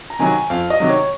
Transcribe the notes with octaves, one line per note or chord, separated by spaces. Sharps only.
A#5
C3 D#3 F#3 G#5
F2 F5
D#5
C3 D#3 F#3
C#5